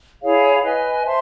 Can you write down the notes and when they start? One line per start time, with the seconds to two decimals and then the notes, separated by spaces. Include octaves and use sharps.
0.22 E4 G#4 C#5 F5
0.62 B4 D#5 G#5
1.03 C5 E5 A5 C6